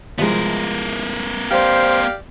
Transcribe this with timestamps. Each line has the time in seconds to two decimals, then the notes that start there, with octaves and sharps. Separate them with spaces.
0.18 C2 F3 G#3 B3 A#4
1.51 G4 C5 D5 F5